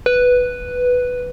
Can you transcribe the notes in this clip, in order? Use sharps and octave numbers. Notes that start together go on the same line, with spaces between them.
B4